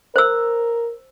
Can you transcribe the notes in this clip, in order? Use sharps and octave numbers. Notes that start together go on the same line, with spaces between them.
A#4 C5 E6